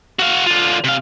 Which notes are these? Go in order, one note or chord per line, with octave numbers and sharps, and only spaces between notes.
F#4 F5
D3 F4
C3 F5